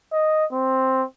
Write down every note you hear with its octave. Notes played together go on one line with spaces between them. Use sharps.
D#5
C4